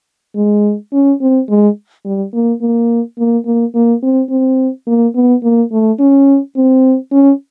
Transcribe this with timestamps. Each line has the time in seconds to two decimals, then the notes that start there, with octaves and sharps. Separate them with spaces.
0.36 G#3
0.93 C#4
1.21 C4
1.49 G#3
2.05 G3
2.33 A#3
2.61 A#3
3.18 A#3
3.45 A#3
3.74 A#3
4.03 C4
4.30 C4
4.87 A#3
5.15 B3
5.43 A#3
5.72 A3
5.99 C#4
6.56 C4
7.12 C#4